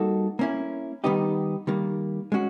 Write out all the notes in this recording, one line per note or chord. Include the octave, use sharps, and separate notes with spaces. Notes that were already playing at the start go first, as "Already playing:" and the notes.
Already playing: G3 A#3 D#4 F#4 A4
A#3 C#4 E4
D#3 G3 B3 D#4 G4
D#3 G3 A#3
G#3 C#4 F#4